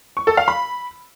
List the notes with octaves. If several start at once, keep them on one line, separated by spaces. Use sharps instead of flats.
C#6
A4
F5
B5